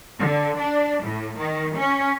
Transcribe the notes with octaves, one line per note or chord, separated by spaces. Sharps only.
D3
D4
A2
D#3
C#4